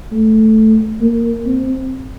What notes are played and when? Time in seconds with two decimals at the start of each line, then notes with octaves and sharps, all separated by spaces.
0.11 A3
1.01 A#3
1.46 C4